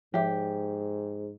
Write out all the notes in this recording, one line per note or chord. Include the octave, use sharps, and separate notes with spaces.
G#2 F3 G4 E5